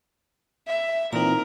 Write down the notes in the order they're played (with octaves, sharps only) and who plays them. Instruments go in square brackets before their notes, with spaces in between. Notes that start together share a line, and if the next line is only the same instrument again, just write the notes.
[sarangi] E5
[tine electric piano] A#2 E3 C4 [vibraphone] D#4 A#5 [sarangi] A#4